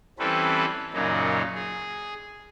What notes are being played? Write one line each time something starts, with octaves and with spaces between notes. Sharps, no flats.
E3 G3 C4 C#4 A4 B4
F#2 A#2 C#3 F#3 D#4
G#4